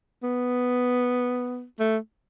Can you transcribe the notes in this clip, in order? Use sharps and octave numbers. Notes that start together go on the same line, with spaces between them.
B3
A3